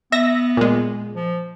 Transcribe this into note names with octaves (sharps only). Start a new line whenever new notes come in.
B3 E5 A#6
A#2 G#3
F3